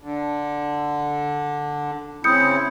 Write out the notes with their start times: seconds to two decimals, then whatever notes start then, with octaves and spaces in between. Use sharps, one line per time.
0.02 D3
2.24 C#3 C4 E4 D#6 G6 C#7